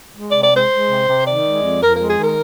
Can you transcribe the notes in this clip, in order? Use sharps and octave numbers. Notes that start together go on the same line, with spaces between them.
G#3
D5
C3
D5
G#3 C5
G#3
C3
C3
D#3 D5
G#3
F2
F2 A#4
G#3 A#4
G#4
D#3
A#4